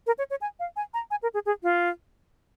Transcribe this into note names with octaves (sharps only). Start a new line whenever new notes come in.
A#4
C#5
C#5
G#5
F5
G#5
A#5
G#5
A#4
G#4
G#4
F4